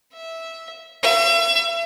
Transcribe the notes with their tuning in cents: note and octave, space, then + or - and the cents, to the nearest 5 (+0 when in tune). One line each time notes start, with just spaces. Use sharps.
E5 -10
E5 +40